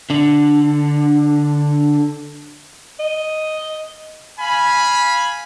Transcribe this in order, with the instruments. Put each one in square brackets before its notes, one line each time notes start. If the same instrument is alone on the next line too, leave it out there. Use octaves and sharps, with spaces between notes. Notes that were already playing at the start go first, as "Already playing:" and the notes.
[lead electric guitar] D3 D4
[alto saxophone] D#5
[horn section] F5 G#5 B5